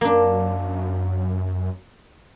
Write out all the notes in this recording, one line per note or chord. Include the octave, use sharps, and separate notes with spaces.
F#2 A#3 D4